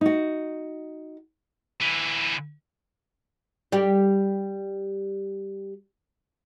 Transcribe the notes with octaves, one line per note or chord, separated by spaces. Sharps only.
D#4 F#4
D3 E3
G3 G4